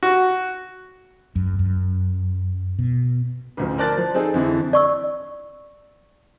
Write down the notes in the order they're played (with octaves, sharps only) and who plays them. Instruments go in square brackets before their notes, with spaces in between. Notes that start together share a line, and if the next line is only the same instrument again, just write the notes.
[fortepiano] F#4
[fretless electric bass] F#2
F#2
B2
[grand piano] A1 D2 F3
A#4 C5 D5 A5 F#6 A6
F3
C4 D#4 G#4 A4
F2 D3 E3
[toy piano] D5 C#6 E6